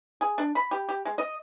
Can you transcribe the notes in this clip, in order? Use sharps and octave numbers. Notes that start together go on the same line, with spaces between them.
G#4
D4
B5
G4
G4
G#3
D#5